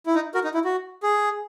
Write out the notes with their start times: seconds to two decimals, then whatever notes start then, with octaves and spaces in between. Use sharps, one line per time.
0.06 E4
0.15 D#4
0.35 F#4 A#4
0.44 D#4
0.54 E4
0.65 F#4
1.03 G#4